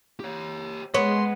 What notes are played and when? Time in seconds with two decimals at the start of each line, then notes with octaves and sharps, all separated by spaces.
0.20 G4 C#5
0.94 G#3 B3 C#5 C6